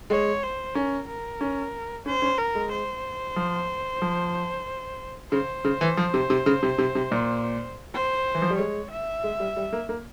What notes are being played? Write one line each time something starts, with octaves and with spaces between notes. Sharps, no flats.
G#3 C#5
C5
C#4 A#4
A#4
C#4
C#4 C5
C#4
A#4
G#3
C5
F3
F3
C#3 C5
C#3
E3
F3
C3
C3
C#3
C3
C3
C3
A#2
C5
E3
F3
G3
G#3 C#5
E5
G#3
G3
G3
A#3
A#3